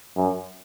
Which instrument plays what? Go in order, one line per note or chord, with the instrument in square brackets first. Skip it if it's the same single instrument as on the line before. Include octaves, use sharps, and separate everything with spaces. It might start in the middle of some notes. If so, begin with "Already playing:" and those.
[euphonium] F#2